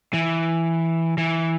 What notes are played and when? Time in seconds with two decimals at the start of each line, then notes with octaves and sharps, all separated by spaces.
0.13 E3
1.18 E3